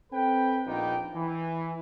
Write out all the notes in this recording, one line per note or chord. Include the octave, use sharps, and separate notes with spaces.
C4 A4 B4 G5
A#1 A#2 A#3 B3 D#4 G5
E3